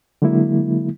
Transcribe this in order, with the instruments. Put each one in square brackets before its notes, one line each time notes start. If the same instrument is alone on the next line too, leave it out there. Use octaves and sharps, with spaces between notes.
[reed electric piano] D3 F#3 G#3 A#3 E4